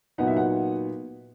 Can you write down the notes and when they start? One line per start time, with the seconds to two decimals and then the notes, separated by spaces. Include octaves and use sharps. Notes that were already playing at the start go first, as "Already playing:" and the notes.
0.18 A#2 F#3 B3 D#4 F#5
0.27 E5
0.37 F#5